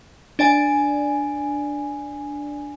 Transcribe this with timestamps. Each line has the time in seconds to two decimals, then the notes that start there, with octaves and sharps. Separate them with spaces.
0.39 D4 D5 G#5